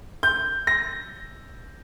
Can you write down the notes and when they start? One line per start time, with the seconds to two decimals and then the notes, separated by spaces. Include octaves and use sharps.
0.23 G6
0.67 A#6